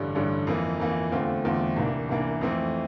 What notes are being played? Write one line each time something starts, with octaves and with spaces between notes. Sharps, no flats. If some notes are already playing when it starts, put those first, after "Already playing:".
Already playing: A1 G2 D3 G3 D4
A1 G2 D3 G3 D4
F2 E3 A#3
F2 E3 A#3
E2 D3 A3 C4 F4
E2 D3 A3 C4 F4
C2 C3 E3 A#3 D4
C2 C3 E3 A#3 D4
F2 E3 A3 C4